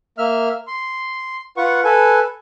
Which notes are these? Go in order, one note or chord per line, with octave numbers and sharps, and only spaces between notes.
A#3 E5 F6
C6
F4 B4 F#5 C#6
A4 B4 G#5